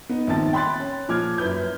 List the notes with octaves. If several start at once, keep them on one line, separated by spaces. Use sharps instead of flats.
B3 D#4
A#1 D#3 C4 A5 A6
G5 B5 C6 F#6 A6
C#4
A#2 F3 D6 F6 G#6
F#2 E4 B4 G6